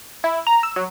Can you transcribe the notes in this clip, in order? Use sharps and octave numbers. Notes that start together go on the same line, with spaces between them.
E4
A#5
E6
F#3